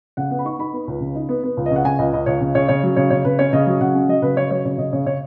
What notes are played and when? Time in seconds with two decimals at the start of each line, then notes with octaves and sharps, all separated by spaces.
0.17 C#3 F#5
0.31 B3 F#5
0.39 B5
0.45 D#4 C#6
0.59 D#4 B5
0.73 B3
0.87 C#2
1.01 C#3
1.15 D#4
1.29 B3
1.44 B3
1.57 C#2
1.66 D#5
1.71 C#3
1.76 F#5
1.85 C#3 G#5
1.99 C#2 D#5
2.13 C#2 D#5
2.26 C#2 C#5
2.41 C#3
2.55 C#3 C#5
2.68 C#3 C#5
2.83 F#3
2.96 C#3 C#5
3.10 C#3 C#5
3.25 C#3 B4
3.39 C#4 C#5
3.53 C#3 D#5
3.66 F#3
3.81 C#3 F#5
3.95 C#4
4.08 F#3 D#5
4.22 C#3 B4
4.37 C#3 C#5
4.51 F#3 C#5
4.65 C#3 C#5
4.78 C#3 D#5
4.93 C#3 C#5
5.06 C#3 C#5